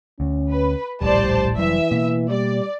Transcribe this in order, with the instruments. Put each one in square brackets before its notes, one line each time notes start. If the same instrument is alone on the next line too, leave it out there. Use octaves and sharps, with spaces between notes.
[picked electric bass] D2 [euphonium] C#4
[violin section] B4
[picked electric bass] D1 A#1 A2 [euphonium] G3 [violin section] C5 D5 A5
[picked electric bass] F1 F#3 G3 [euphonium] E3 [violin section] E5
[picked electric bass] B2 A#3 B3
[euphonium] G3 [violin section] D5